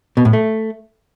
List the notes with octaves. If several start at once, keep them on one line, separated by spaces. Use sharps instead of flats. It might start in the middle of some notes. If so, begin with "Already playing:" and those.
B2
A2
A3